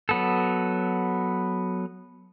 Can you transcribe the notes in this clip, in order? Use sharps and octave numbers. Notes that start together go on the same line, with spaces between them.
F#3 B3 A4